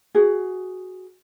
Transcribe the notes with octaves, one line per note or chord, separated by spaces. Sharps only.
F#4 G#4